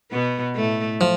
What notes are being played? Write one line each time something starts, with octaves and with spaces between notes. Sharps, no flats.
B2 B3
A2 A3
F3